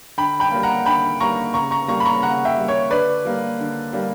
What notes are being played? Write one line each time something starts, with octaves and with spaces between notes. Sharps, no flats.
D3 G5 B5
G5 B5
G3 A#3
F#5 A#5
D3 G5 B5
G3 A#3 A#5 C#6
C#3 A#5 C#6
A#5 C#6
G3 A#3 A#5 C#6
B5
A#5 C#6
C#3 F#5 A#5
E5 G5
G3 A#3
C#5
D3 B4 D5
G3 A#3
D3
G3 A#3